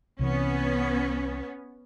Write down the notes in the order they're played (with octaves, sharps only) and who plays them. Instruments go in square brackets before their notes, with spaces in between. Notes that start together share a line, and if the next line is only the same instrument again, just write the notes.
[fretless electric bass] C2 C3 E3 [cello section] B3 C#4